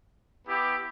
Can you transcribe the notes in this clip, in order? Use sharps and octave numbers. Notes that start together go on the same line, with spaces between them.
B3 E4 G4